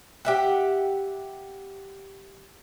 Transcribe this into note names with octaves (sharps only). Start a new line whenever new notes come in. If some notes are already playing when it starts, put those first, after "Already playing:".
G4 E5 F#5